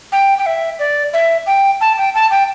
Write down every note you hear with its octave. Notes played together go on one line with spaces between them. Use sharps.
G5
G5
E5
D5
E5
G5
A5
G5
A5
G5